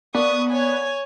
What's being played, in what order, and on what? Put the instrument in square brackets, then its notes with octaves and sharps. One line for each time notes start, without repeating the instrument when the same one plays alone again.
[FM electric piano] A#3 D4 [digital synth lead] B3 [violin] C#6 D#6
[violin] C#5 G#5